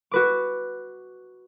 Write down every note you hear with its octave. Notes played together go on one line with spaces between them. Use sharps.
F#4 B4 D6